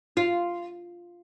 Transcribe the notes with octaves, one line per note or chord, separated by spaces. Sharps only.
F4